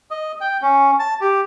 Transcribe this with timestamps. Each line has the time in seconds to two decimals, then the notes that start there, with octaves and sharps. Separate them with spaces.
0.11 D#5
0.41 G5
0.62 C#4
0.99 A5
1.21 G4